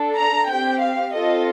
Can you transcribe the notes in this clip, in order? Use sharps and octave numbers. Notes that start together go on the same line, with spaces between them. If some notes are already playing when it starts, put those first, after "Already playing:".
Already playing: D4 A4
A#5
C4 G4 G5
F5
C4 F4 A4 D#5